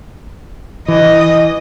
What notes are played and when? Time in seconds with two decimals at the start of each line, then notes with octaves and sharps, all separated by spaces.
0.88 E3 D#5